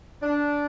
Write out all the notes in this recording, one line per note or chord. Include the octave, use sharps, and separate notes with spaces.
D4